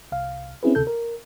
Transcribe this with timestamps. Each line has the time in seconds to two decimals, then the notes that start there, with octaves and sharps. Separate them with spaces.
0.12 C2 F5
0.63 C4 C#4 E4 G#4 B4
0.75 D2 C3 A4 G6
0.87 A#4